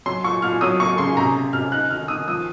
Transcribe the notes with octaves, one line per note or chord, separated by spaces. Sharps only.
F#3 C6
A#2 C#6
A#2 F6
F#3 D#6
A#3 C#6
C#3 C6
C3 A#5
C3
C3 F6
D#4 F#6
D#3 F6
D#3 D#6
F3 D#6